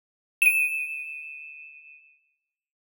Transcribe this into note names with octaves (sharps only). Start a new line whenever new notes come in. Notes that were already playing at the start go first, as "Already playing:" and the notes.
D#7 E7